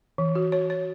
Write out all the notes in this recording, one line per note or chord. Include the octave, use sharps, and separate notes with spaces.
E3
F#4
C#5
C#5